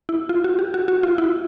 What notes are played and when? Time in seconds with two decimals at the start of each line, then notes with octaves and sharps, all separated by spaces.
0.09 E4
0.29 F4
0.44 F#4
0.59 G4
0.74 F#4
0.88 F#4
1.03 F4
1.18 E4